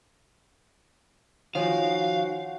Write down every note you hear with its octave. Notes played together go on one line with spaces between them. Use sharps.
D#3 F3 D#4 F#4 C5 C#5 F5 G#5